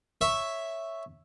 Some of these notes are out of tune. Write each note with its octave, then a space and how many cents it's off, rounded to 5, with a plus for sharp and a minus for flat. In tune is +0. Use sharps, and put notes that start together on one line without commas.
C#5 +0 E5 +0